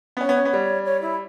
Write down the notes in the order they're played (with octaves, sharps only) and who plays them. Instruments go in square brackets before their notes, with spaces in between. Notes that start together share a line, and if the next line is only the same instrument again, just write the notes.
[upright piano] B3
[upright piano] C#4 [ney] C#5
[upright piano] B3
C#4
B3
G3
[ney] C#5
E4